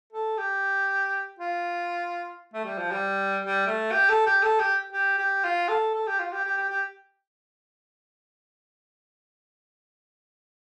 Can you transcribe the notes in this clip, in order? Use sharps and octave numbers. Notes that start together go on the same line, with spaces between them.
A4
G4
F4
A3
G3
F3
G3
G3
A3
G4
A4
G4
A4
G4
G4
G4
F4
A4
A4
G4
F4
G4
G4
G4
G4